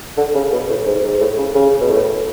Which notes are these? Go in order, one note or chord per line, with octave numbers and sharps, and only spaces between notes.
D3
C#3
B2
A2
G#2
G#2
A2
C#3
C#3
B2
A2